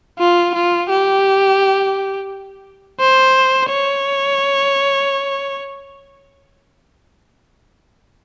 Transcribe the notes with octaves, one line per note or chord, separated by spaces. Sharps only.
F4
F4
G4
C5
C#5